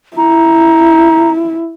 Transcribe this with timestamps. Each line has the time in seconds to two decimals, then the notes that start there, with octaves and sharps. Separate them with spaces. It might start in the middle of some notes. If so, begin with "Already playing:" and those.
0.17 E4 A#5